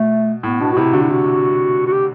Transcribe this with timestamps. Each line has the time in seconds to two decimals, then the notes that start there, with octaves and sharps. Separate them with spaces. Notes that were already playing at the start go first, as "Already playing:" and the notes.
Already playing: B2 A3
0.43 A2 B3
0.60 B2 D4
0.73 F#4
0.77 C3 E4
0.93 D3 F#4
1.01 E4
1.10 F#4
1.87 F#4
1.92 G4